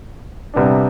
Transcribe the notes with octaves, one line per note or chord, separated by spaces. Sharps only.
C2 C3 G3 B3 D4